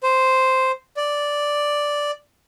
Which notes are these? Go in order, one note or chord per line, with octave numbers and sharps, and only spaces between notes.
C5
D5